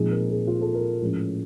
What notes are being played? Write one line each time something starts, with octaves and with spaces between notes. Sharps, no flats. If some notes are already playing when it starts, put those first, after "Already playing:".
Already playing: A#2 F3 G#3 C4 D#4 G#4
A#4
G#4
F4
A4
A#4
A2 F3 G#3 C#4